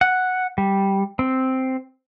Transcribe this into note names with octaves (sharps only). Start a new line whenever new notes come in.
F#5
G3
C4